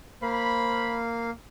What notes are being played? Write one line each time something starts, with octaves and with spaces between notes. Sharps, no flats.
A#3 C5 F5 B5